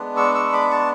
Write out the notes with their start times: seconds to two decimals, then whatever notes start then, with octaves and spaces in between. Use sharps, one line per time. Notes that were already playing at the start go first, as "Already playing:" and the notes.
Already playing: G#3 B3 D4
0.17 C#6 E6
0.35 C#6 E6
0.53 B5 D6
0.71 A5 C#6